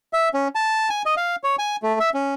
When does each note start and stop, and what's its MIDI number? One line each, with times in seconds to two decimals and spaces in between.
0.13 0.29 76
0.34 0.48 61
0.55 0.89 81
0.90 1.02 80
1.06 1.15 75
1.17 1.36 77
1.44 1.56 73
1.59 1.76 80
1.83 1.99 57
2.00 2.10 76
2.14 2.34 61